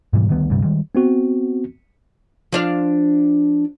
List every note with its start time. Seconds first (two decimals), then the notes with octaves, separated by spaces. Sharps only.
0.13 G#2 B2 E3 G3
0.29 D2 D#3 G3 B3
0.50 D2 G2 C3 G3
0.63 D#3 G3 G#3
0.95 B3 C4 F#4
2.52 F3 D4 F5